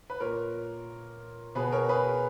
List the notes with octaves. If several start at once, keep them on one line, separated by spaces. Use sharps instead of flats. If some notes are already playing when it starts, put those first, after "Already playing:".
B4
A#2 A#4 C#5
B2 G#4 B4
A#4 C#5
G#4 B4